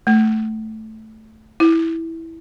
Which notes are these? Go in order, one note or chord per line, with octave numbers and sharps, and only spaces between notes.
A3
E4